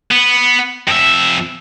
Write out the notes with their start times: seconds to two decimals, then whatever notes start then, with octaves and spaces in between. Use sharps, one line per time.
0.11 B3
0.88 F2 E5